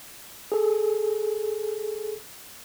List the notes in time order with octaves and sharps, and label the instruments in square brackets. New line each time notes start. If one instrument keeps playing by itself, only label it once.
[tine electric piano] G#4 A4